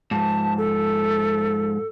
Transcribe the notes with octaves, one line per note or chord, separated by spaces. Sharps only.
G#2 F3 A5
A4